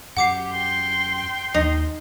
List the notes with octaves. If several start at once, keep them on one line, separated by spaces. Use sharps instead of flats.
F#2 G4 F#5 D6 C7
G5 C6
D#2 D#4